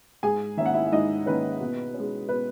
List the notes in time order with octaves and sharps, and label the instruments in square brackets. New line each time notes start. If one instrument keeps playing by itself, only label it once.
[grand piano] G#2 G#4 G#5
D#3 A#3 C#4 E5
F#5
E4 E5
E5
G#2 D#4 D#5
D#3 A#3 C#4 B4
B2
C#4
G#3
B2 B4